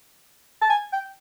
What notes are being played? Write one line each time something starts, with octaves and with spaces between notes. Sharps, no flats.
A5
G#5
G5